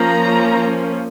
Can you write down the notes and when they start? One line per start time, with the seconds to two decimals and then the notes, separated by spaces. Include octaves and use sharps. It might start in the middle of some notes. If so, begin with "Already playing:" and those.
Already playing: F3 A#3 C#4 A#5